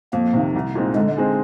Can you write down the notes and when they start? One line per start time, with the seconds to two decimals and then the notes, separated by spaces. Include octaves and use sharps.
0.13 F2 A#3
0.33 C3 D#3
0.55 C2
0.75 A#2 G#3 C4 D#4
0.96 D3 G#3
1.17 G#3 C4 D#4 G#4